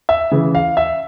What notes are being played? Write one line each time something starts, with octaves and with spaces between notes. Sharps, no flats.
E5
C#3 E3
F5
E5